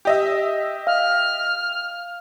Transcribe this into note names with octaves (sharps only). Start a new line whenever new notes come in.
G4 D#5 E5
F5 F6